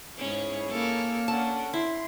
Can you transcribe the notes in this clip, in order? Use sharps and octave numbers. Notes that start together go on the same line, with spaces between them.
G#2 C#4 E4 G#4 C#5
A#3 C#4 A4 A#4
C#4 D4 A4 F#5 A5
E4 C6